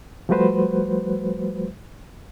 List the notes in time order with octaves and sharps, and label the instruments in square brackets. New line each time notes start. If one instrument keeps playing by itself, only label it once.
[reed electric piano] F3 G3 A3 F#4 B4 C5